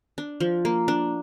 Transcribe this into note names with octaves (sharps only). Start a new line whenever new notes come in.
D4
F3
A#3
D4